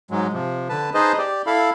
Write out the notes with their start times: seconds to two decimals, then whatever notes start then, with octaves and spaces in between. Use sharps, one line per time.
0.11 G#2 F#3 G#3
0.33 C3 F3
0.69 D3 B4 A5
0.94 D#4 G#4 B4 C5 D#5 A5
1.18 G4 D5
1.46 E4 A4 F5 B5